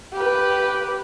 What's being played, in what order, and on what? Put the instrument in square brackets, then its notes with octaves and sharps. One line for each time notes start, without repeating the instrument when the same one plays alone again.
[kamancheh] G4 B4